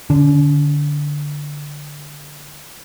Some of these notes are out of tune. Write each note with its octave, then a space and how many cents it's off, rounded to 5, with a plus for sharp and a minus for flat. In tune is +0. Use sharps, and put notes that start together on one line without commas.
D3 +0 C#4 +45